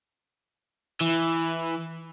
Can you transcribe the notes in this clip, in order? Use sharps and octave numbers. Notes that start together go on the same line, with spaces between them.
E3